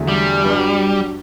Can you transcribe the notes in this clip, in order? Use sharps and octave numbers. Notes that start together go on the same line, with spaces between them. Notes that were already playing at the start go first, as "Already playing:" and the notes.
Already playing: E2 D3 F#3 A3
G3
G2 F#3 B3 D4 F#4